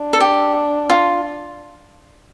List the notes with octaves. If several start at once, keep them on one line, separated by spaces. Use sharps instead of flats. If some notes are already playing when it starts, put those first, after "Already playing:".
Already playing: D4
A4
G4
F4